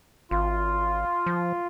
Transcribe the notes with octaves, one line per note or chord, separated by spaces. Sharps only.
G#1 F4
F3